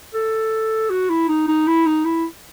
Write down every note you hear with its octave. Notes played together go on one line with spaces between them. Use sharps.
A4
F#4
E4
D#4
D#4
E4
D#4
E4